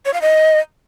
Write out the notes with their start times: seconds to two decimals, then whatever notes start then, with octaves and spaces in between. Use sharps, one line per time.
0.06 C#5
0.14 F5
0.22 D#5